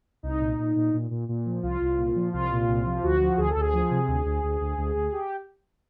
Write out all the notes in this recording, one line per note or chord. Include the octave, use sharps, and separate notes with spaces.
C2 D#4
A#2
A#2
A#2
A#2
A#2
A#2
F3
C2 F4
C2
A#2
F3
C2 F4
A#2
C2
F3
D2 F#4
F3
D2 G#4
A4
D2 G#4
F3
C3
D2
D2
D2
D2
D2
D2
G4